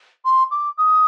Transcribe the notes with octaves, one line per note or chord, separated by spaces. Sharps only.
C6
D6
D#6